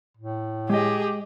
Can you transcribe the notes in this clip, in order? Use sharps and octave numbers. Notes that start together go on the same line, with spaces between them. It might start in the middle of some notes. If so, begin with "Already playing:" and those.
A2
G#3 G4 G#4 D#5